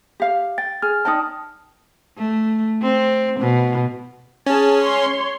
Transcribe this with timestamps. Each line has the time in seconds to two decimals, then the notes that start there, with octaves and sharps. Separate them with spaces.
0.20 G4 F5
0.58 G5 A6
0.82 G#4 F6
1.05 D#4 D5 G5 A5 D#6
2.18 A3
2.82 C4
3.40 B2
4.46 C#4 G#4 A5
4.81 C#5 C6